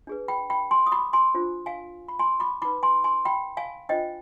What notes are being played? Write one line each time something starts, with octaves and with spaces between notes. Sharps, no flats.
D4 G#4 B4
G5 B5
G5 B5
G#5 C6
D#6
B5 D6
G#5 C6
D4 F4 C5
F5 G#5
B5
G#5 C6
B5 D6
D#4 B4 B5 D6
G#5 C6
G#5 C6
G5 B5
F5 G#5
D4 F4 C5 D#5 G5